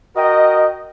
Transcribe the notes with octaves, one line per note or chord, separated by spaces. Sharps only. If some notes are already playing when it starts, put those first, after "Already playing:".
F#4 A#4 D#5 G5